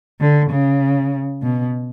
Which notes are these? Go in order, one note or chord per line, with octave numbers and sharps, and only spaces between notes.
D3
C#3
B2